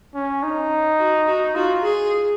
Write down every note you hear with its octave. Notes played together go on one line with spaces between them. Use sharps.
C#4
D#4
F#4
F#4
F4 F#4
G#4